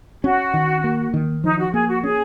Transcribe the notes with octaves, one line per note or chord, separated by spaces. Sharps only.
C#4 F#4
D#3
A#3
D#3
F3 D#4
F#4
A#3 G#4
F#4
C#4 G#4